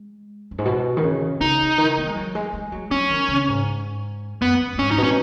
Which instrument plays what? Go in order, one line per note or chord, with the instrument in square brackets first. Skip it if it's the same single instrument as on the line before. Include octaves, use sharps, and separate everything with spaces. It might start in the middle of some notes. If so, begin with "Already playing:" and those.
Already playing: [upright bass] G#3
F#2
G#2
B2
D#3
C#3
[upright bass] C#3 [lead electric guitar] D#4
[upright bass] D#3
B3
G#3
F#3
G#3
G#3
F#3
[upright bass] F#3 [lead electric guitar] C#4
[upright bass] D#3
C#3
G#2
[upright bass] F#2 [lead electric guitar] B3
[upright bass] F#2
F#2
[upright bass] G#2 [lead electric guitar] C#4
[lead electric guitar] D#4
[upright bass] B2
[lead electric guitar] C#4